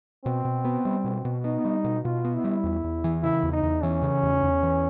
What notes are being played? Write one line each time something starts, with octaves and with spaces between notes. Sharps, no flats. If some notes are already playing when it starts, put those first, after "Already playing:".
B2 C4
B2
B3
G3
B2
B2
B3 D#4
G3
B2
B2 F4
B3
E4
G3
E2
E2
E3
C#3 E4
E2
D#4
E2
E3 C#4
C#3
E2
E2
E3